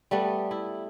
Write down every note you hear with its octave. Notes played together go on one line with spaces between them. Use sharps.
G3 A3 B3
E4